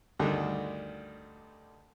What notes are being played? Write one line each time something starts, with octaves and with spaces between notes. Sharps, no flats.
D2 G2 D3 D#3